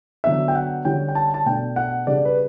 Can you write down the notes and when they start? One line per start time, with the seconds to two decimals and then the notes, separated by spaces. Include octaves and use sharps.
0.24 D3 F#3 B3 D4 E5
0.48 G5
0.55 F#5
0.85 D3 G3 C#4 G5
1.09 G5
1.15 A5
1.34 A5
1.46 B2 A3 D4 G5
1.76 F#5
2.07 C#3 G3 D4 D5
2.25 B4